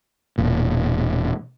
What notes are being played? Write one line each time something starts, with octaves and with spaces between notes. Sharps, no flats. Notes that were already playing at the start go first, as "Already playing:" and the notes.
E1 A#2